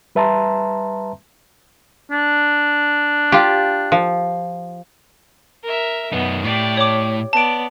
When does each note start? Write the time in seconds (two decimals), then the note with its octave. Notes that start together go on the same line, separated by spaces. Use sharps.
0.15 G3 B4 E5 A5 A#5 C6
2.12 D4
3.32 F4 G4
3.92 F3
5.63 A#4 E5
6.12 F#2 B3 D#4
6.44 A2 G4 D5
6.77 C#5 D6
7.33 B3 D5 A5 D7